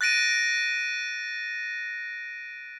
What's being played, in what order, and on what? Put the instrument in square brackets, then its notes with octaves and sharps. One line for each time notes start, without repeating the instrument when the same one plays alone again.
[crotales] F#6 A6 A#6 D7 D#7